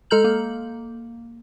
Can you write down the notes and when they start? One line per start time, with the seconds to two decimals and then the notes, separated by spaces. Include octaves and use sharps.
0.10 G#3 A4 A#5 F6 G6 F#7
0.24 A#3